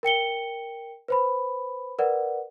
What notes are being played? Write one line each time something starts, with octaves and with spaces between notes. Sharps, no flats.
A#4 G5 C#7 G7
B4 C5 B5
A#4 B4 D5 F#5